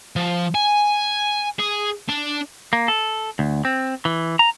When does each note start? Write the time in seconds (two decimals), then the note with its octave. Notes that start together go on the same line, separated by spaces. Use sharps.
0.16 F3
0.55 G#5
1.59 G#4
2.09 D4
2.73 A#3
2.88 A4
3.39 D2
3.65 C4
4.05 E3
4.39 A#5